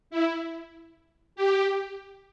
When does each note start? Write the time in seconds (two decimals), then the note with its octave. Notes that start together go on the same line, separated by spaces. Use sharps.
0.10 E4
1.36 G4